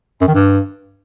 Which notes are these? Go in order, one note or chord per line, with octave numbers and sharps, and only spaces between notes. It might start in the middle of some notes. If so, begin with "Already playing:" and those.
F#2
D#3
G2